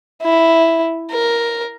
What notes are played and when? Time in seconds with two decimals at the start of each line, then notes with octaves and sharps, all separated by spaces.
0.23 E4
1.10 A#4